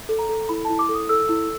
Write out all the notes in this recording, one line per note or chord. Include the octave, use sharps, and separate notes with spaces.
A4
A#5
A4
E4 B5
E4 A5
D6
A4
D#6
A4 E6
E4